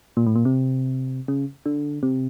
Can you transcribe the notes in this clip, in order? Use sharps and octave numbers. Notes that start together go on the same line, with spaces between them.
A#2
A2
A#2
C3
C#3
D3
C3